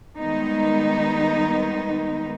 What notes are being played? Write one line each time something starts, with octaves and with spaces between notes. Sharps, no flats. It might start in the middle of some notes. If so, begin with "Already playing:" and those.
D#3 G3 G#3 B3 D#4